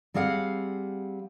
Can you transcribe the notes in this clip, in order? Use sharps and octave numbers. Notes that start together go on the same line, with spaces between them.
G3 C4 G#4 F5 F#5